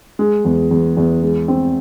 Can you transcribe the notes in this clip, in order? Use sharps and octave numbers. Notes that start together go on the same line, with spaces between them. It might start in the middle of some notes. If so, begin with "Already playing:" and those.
G#3
E2
E2
E2
G#3
C4